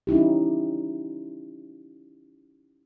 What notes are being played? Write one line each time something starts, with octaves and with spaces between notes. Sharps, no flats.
C#4 D#4 E4 G4